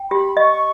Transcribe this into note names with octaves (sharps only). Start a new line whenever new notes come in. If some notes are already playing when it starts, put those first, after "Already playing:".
Already playing: G5
G4 B5
D#5 C#6